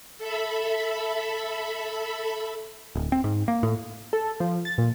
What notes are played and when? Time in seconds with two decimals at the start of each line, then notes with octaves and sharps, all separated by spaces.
0.18 A4 E5 B5
2.95 D1
3.12 C4
3.24 G#2
3.48 A#3
3.63 A2
4.13 A4
4.40 F3
4.65 A6
4.78 A#2